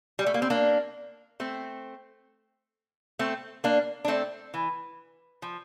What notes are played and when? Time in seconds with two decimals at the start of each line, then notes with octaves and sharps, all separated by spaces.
0.19 G3
0.26 A3
0.34 A#3
0.42 C4
0.50 A#3 D4
1.40 A3 C4
3.19 A3 C4
3.64 A#3 D4
4.05 D4
4.08 A3 C4
4.54 E3
5.42 F3